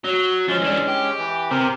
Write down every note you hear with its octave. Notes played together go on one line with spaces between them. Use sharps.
F#3
F3 G#3 C#4
E3 D4
G4
E3
C3 G4 A#4 C5